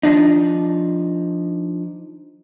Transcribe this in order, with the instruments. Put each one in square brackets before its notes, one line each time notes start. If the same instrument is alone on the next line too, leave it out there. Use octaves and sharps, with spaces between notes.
[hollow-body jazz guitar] F3 D4 D#4